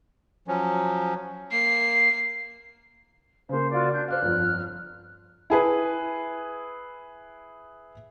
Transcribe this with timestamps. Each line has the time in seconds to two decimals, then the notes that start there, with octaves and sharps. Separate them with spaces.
0.48 F3 F#3 C#4
1.52 A#3 C7
3.49 C#3 A#3 C5
3.71 F4 F#4 D5
3.92 D4 G6
4.08 C5 D5 F5 F6 F#6
4.22 G1 F2
5.50 E4 G#4 B4